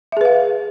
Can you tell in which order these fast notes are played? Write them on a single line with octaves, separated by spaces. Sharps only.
E5 G#4 B4 F5